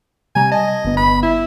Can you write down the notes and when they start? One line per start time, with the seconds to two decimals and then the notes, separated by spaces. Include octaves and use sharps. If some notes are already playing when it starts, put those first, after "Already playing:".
0.35 C3 G3 G#5 A#5
0.51 D#5 A5
0.84 G1 G2 B3
0.97 B5
1.23 E4